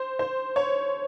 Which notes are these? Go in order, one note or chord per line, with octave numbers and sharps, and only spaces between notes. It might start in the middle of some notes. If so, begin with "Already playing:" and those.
Already playing: C5
C5
C#5